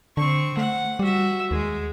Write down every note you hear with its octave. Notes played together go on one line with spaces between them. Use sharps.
D3 C4 C#6
A3 F#5
G3 F#4 E5
D#2 G#3